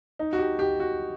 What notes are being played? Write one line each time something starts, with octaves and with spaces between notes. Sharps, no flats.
D#4
F#4
G4
G4
F#4